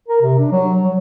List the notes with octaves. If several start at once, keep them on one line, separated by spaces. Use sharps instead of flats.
A#4
C3
D4
F#3
F#3